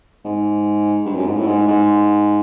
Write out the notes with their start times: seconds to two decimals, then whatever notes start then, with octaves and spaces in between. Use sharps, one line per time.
0.25 G#2
1.06 G2
1.16 F#2
1.27 G#2
1.37 A2
1.47 G#2
1.68 G#2